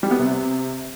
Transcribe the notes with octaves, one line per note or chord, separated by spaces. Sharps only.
G3
B3
C3